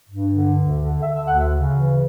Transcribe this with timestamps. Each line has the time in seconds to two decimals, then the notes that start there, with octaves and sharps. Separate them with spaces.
0.10 G2
0.33 D3
0.57 D2
0.80 D3
1.03 D3 E5
1.15 E5
1.27 D2 F#5
1.38 E5
1.50 C#3
1.73 E3